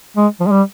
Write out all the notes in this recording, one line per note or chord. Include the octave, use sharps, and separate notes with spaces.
G#3
F3
G#3
G3